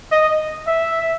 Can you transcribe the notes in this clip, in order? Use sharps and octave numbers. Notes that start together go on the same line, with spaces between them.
D#5
E5